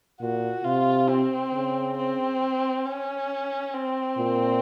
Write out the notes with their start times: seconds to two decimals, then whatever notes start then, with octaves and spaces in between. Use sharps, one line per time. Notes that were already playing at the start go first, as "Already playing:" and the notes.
0.21 A#2 F#4
0.64 C3 F4
1.09 C4
1.53 C#3
1.97 C4
2.85 C#4
3.73 C4
4.17 A#2